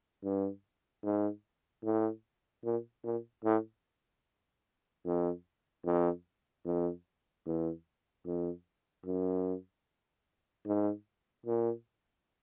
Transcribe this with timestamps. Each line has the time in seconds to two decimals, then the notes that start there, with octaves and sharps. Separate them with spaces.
0.23 G2
1.03 G#2
1.84 A2
2.64 A#2
3.04 A#2
3.44 A2
5.05 F2
5.85 F2
6.65 F2
7.45 E2
8.26 F2
9.06 F#2
10.65 G#2
11.46 A#2